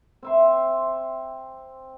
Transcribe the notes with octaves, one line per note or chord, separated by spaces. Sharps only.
C4 E5 C6